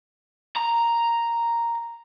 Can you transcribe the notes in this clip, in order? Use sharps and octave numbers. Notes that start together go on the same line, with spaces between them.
A#5